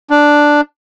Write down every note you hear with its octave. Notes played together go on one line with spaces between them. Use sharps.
D4